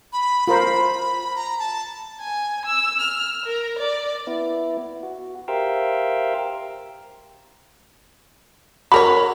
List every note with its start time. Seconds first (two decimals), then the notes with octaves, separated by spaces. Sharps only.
0.13 B5
0.47 F4 A#4 C5 B5
1.36 A#5
1.59 A5
2.21 G#5
2.65 E6
3.00 F6
3.45 A#4
3.79 D5
4.27 B3 E4
5.03 F#4
5.48 G4 A#4 C5 E5 F5 G5
8.92 F#4 A#4 C#5 B5